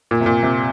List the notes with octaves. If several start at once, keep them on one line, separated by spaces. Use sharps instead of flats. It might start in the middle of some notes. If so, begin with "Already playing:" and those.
A#2
C3
A#2
C3